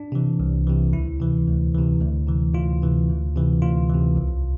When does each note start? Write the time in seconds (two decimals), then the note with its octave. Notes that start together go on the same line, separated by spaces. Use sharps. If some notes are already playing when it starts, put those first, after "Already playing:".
Already playing: D4
0.12 C3 E3
0.40 C2
0.67 C3 E3
0.93 D2 E4
1.20 C3 E3
1.48 D2
1.74 C3 E3
2.01 D2
2.28 C3 E3
2.54 D2 F4
2.82 C3 E3
3.09 D2
3.36 C3 E3
3.62 D2 F4
3.90 C3 E3
4.16 C2